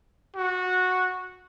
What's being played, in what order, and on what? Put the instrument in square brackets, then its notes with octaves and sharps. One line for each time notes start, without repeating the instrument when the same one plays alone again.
[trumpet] F#4